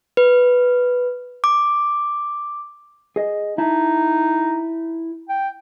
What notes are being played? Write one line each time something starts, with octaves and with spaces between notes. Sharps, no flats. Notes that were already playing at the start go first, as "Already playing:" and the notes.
B4
D6
G#4 D#5
D#4 E4 A5
G5